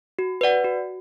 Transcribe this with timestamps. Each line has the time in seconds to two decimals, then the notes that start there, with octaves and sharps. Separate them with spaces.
0.19 F#4
0.41 B4 D5 F#5
0.64 F#4